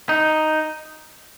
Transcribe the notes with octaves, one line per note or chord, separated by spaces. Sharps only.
D#4